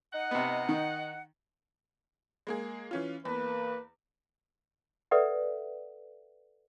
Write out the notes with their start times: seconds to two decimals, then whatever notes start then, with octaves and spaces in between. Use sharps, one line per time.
0.12 D#4 D#5 F#5
0.31 C3 B3
0.69 D#3
2.47 G#3 A#3 G#4
2.91 E3 C#4 F4
3.25 E2 A#3 B4
5.11 A4 B4 D5 E5 F#5